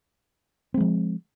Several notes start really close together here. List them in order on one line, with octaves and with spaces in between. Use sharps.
C4 G#3 F3